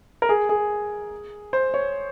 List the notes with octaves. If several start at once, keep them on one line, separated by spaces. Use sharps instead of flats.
A#4
G#4
G#4
C5
C#5